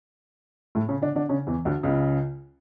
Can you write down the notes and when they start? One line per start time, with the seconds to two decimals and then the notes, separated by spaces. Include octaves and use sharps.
0.75 A2 A3
0.88 C#3 C#4
1.02 D3 D4
1.16 D3 D4
1.29 C#3 C#4
1.47 E2 E3
1.65 D2 D3
1.83 C#2 C#3